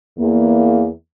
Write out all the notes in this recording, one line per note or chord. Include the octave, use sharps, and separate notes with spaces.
E2 A#3